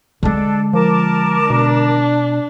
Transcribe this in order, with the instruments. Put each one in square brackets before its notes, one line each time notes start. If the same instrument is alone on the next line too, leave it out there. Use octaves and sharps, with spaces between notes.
[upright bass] D3 G#3 [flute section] D4 A4
[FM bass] F3 [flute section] A#4 A5 D6
[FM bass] B2 [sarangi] D4